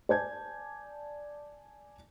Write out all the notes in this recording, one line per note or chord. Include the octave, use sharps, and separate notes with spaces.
D5 G#5 A5 G6 G#6